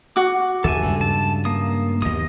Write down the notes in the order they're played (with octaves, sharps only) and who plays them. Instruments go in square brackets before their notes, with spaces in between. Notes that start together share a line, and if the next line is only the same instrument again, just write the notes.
[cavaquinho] F#4 D6
[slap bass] D#2 [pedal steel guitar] A4 E5 G#5
[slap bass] G2 C#3 G#3
[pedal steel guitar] A5
A#3 D#6
[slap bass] D#2 B2 [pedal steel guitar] D#5 D#6